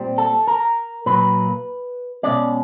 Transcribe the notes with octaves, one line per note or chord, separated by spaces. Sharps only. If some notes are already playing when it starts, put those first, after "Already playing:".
Already playing: A#2 G3 C4
A4
A#4
A#2 F#3 A#3 B4
B2 G#3 C#4 D5